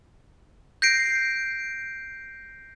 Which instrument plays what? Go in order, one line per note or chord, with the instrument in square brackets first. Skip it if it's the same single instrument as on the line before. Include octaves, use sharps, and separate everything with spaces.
[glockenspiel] G6 A#6 C7 D7